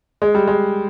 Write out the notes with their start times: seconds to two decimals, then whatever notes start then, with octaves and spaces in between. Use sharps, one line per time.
0.22 G#3
0.35 G3
0.47 G#3